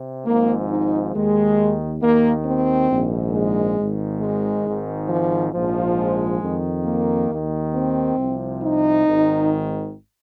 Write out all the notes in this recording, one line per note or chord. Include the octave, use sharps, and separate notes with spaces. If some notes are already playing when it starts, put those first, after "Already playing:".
Already playing: C3
G#1 G#2 F3 A#3
D#4
D#2 D#3 G#3
D#2 D#3 A#3
C4
A#1 G#2 D#3
G#3
G#1 G#2 D#3
G#3
G#1 G#2 D#3
F3
A#1 G#2 F3
G#3
F2 D#3
A#3
D#2 D#3
C4
C2 C3 F3
D#4
G#1 G#2 D#3